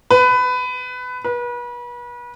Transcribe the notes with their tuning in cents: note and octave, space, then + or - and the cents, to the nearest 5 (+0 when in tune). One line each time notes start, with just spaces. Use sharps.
B4 +20
B4 -35